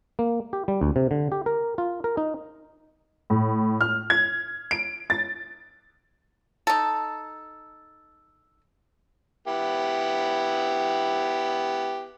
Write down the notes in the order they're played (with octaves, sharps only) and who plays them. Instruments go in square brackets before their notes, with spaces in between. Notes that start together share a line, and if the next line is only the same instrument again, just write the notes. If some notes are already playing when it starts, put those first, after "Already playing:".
[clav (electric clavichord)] A#3
G4
G3
D2
C3
D3
G4
A#4
F4
A#4
D#4
[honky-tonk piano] A2
F6
G#6
D7
A6
[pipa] D#4 A4
[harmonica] B3 E4 G4